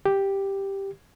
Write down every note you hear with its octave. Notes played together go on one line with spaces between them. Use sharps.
G4